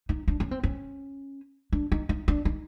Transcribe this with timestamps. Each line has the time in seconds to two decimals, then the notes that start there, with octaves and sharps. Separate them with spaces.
0.09 D#4
0.28 D4
0.40 C#4
0.51 C4
0.63 C#4
1.72 D4
1.92 D#4
2.09 D#4
2.28 D4
2.45 D#4